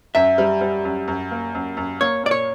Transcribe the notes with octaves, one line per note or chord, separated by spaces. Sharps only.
F#2 E5
G3
G3
F#2
F#2
A#3
F#2
F#2
A#3 C#5
A#2 D5
C#5